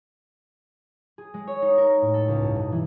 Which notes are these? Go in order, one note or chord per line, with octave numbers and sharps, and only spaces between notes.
G#4
G#3
C#5
D#4
A#4
A#4
A2
A4
C#2
G2
B2
E3